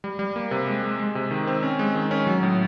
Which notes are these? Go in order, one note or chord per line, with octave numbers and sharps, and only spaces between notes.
G3
G3
A#3
C3
G#3
G#3
G#3
C3
D#3
C4
C#4
G#3
D#3
C#4
F#3
A2